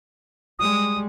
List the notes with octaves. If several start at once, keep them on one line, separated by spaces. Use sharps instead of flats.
G3 G#3 D#6